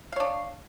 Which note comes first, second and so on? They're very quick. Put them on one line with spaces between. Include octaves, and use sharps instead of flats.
F5 C#5 D4